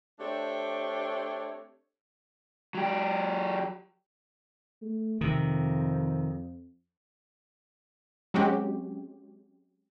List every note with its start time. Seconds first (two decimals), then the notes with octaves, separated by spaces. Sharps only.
0.19 A3 C4 D4 G4 C#5
2.75 F#3 G4
4.82 A3
5.21 F2 C3 D#3
8.34 F#3 G#3 C4 C#4 F#4 G4